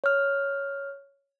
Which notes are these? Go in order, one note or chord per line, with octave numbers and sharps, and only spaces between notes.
C#5 F6